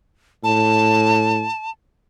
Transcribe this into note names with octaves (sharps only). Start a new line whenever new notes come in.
A2 A5